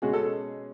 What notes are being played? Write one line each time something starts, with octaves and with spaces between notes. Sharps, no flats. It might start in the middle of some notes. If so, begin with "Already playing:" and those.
B2 G#3 C#4 F#4 G#4
A4